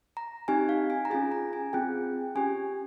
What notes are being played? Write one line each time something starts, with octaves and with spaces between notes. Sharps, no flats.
A#5
C4 D#4 G4 G#5
F5
G#5
A#5
C#4 F4 G#4 G#5
A#5
G#5
C4 F4 G#4 G5
C#4 G4 G#5